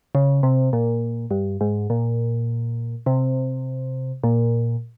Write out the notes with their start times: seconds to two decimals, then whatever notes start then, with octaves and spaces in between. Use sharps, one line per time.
0.15 C#3
0.43 C3
0.73 A#2
1.31 G2
1.61 G#2
1.90 A#2
3.06 C3
4.24 A#2